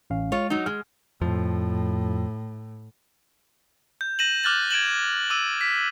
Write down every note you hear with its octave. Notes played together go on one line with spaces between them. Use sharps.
A1 C#4 F5
G#3 F4 C#5
F#3 D#4
G#3 F6
F2 A2 F3
G6
G6 A#6 D#7 E7 F#7
D6 F6 F#6 A6 F#7
G#6 D7 E7 F#7
D6 E6 D#7
B6